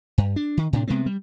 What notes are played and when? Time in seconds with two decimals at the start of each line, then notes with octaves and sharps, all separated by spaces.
0.18 G2
0.36 D4
0.57 D#3
0.73 A2 C3 D4
0.88 C3 G#3 B3 C4
1.06 G3